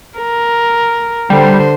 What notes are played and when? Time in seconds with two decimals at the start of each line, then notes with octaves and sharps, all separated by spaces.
0.19 A#4
1.30 D3 G3 C5